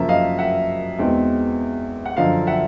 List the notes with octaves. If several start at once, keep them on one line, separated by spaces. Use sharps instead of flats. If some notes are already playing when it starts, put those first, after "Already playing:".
Already playing: F#2 C#3 F3 A#3 C#4 E5
D#5 F5
E5 F#5
E2 B2 G#3 C4 D#4
F#5
F#2 D3 F3 D#5 F5
E5 F#5